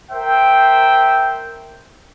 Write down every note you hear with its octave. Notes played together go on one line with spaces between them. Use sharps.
A#4 C5 E5 G5